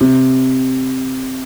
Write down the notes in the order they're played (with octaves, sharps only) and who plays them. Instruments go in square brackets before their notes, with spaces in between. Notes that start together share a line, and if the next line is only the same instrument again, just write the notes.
[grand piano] C3